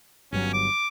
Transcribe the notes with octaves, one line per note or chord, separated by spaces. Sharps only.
G1 G2 F#3 C#4
D6